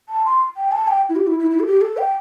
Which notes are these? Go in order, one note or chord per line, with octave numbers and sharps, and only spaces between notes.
A5
C6
G5
A5
G5
E4
G4
E4
E4
E4
A4
G4
A4
G5